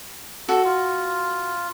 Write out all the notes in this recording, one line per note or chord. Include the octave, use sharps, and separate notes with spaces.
F#4 A4
F4